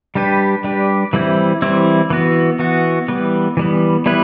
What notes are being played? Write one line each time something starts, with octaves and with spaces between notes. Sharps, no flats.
G3 D4 G4 B4
G3 D4 G4 B4
E3 G3 C4 E4
E3 G3 C4 E4
E3 B3 F#4
E3 B3 F#4
E3 G3 B3
E3 G3 B3
G3 B3 E4 B4